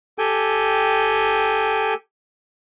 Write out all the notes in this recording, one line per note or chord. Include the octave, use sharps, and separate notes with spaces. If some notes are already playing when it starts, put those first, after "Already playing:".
G4 A4 G5 G#5